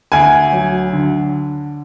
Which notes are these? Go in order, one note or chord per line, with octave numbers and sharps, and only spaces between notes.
D2 G#5
F#3
D3